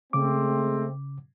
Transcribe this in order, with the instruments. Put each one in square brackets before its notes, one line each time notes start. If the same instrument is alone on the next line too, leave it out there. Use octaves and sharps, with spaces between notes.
[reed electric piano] C#3 D6 [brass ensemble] G#3 A3 C4